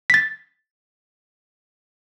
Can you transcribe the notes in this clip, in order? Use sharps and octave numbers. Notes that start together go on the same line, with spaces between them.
A6 B6